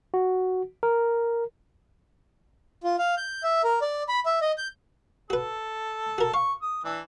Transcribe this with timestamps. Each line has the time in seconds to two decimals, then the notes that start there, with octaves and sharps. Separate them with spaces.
0.14 F#4
0.83 A#4
2.84 F4
2.99 F5
3.17 G6
3.43 E5
3.64 A#4
3.82 D5
4.09 B5
4.26 E5
4.41 D#5
4.58 G6
5.30 F#4 A4 B4
6.18 F#4 A#4
6.34 F5 C#6
6.62 D#6
6.85 E3 D4